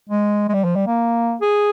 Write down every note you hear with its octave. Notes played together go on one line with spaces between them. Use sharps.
G#3
G#3
G3
F3
G3
A#3
G#4